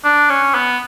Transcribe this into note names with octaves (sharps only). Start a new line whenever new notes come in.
D4
C#4
B3